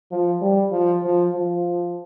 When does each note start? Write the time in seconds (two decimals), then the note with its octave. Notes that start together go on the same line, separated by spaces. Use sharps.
0.12 F3
0.41 G3
0.72 F3
1.03 F3
1.33 F3